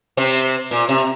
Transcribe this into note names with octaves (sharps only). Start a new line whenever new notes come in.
C3 C4
A#2
C3